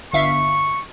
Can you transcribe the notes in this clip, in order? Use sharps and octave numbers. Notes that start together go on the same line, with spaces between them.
G1 E5 F5 C#6